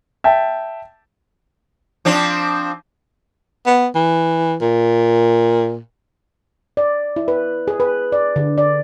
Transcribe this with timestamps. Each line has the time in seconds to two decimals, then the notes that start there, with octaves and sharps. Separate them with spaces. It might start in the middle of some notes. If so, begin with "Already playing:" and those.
0.24 E5 G5 A5
2.05 F3 C4 D4
3.66 B3
3.95 E3
4.61 A#2
6.77 D5
7.16 E4
7.28 B4
7.68 G#4
7.80 B4
8.12 D5
8.36 D3
8.58 D5